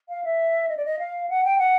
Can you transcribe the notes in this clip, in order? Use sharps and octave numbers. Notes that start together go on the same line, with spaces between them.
F5
E5
D#5
D5
D#5
F5
F#5
G5
F#5